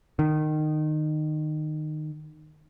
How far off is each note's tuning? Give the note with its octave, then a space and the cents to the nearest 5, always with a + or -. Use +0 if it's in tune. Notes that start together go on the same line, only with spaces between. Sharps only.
D#3 -20